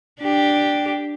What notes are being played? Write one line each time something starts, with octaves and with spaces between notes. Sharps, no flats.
D4 G4